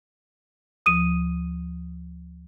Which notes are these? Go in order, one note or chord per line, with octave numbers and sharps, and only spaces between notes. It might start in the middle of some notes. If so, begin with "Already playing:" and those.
D2 F3 D#6 D#7